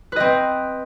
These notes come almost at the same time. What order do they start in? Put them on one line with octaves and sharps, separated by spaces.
B4 D#5 C4